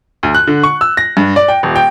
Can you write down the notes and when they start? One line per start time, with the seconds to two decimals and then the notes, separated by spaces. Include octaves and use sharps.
0.23 D2
0.35 F#6
0.47 D3
0.63 C#6
0.81 E6
0.97 A#6
1.17 G2
1.36 D5
1.48 G5
1.63 D#1
1.76 G5